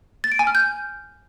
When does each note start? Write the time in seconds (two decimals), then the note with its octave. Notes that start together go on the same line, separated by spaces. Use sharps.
0.24 A6
0.32 D7
0.39 G#5
0.47 F6
0.55 G6